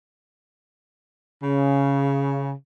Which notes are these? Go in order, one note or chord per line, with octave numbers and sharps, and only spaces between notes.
C#3